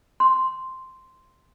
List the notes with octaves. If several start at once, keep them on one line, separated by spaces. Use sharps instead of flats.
C6